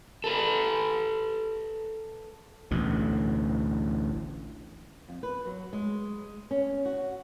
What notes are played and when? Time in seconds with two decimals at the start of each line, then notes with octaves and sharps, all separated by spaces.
0.24 A4 B4
2.71 A1 D2 B2
5.09 F2
5.23 B4
5.46 F#3
5.73 G#3
6.51 C#4
6.85 F#4